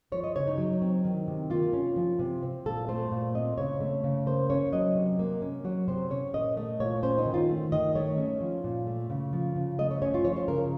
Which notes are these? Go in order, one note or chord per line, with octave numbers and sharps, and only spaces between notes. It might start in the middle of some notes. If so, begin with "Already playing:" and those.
F3 C#5
D#5
C#3 C#5
D#4
F#3
C4
D#3
C3
A#3 F4
C#4
F3
C3
C4
A#2 A4
A3 C5
A#2
C4 D#5
C#3 C#5
A3
C#3
A#3 C5
C#4 C#5
F#3 D#5
C3
A#3
C#4
F#3 C#5
C3 C5
C#4 C#5
A#2 D#5
A3 D#5
A#2 C#5
C#4 C5
D#4
D#3
F4
A3
D#3 D#5
A3 C#5
C#4
F3
A#2
A3
C#3
F3
C#3
A3 D#5
C#5
C#4 C#5
F4
F3 C#5
C5
C#3 A#4